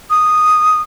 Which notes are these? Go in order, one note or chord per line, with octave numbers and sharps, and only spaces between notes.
D#6